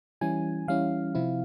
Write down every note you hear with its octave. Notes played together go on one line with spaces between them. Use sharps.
E3 G3 C#4 E4 G#5
E3 G3 C#4 E4 F5
C3 F3 C4 E4